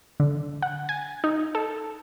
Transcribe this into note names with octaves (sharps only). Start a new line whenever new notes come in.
D3
F#5
G#5
D#4
A4